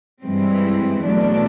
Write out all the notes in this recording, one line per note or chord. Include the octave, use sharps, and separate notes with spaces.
G2 E3 G#3 C4
E2 B2 F#3 A3 D4